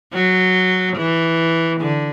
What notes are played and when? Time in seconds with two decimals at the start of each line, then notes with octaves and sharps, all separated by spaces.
0.14 F#3
0.97 E3
1.81 D3